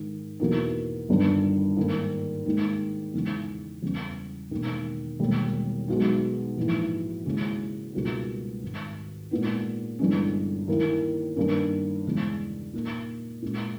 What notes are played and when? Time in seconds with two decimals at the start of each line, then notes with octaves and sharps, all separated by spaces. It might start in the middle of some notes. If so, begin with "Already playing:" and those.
Already playing: G#2 D#3 G#3
0.40 E2 B2 A#3 D#4
1.08 G1 G2 D#3
1.77 G#2 D#3 A#3
2.45 D#2 D#3 G#3 D#4
3.14 E2 C#3 G#3 D#4
3.82 E2 C#3 E3 G3 C#4
4.51 E1 D#2 D#3
5.19 E1 D#2 D#3 G3
5.88 B1 B2 G#3 D#4
6.57 A#1 G#2 E3
7.25 D#2 C#3 G#3 C#4 E4
7.93 C#2 B2 G3 A#3 D#4
8.63 G#1 G#2 D#3
9.31 A#2 G#3 B3 D#4
9.99 G1 G2 E3 G#3 C#4
10.68 D#2 D#3 A#3 E4
11.36 G2 D#3 A#3 C#4
12.05 E2 C#3 G#3
12.74 A#2 A#3 D#4
13.42 A#2 G#3 C#4